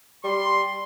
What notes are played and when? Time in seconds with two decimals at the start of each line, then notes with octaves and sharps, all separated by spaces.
0.24 G3 C6